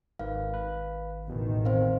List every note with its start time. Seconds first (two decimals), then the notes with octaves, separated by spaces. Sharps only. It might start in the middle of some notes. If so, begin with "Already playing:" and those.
0.19 G#1 G#2 A#4 B4 F5
0.54 B4
1.27 A1 E2 B2 D#3 E3
1.65 E2 C4 C5 F5